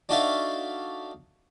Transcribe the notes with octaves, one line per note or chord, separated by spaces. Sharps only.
D4 D#4 F#4 A4 E5 F5